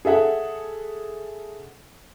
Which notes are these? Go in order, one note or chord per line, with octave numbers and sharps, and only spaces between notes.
G#4 A4 E5 F#5